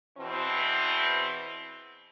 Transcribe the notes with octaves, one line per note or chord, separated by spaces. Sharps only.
E2 B2 E3 C4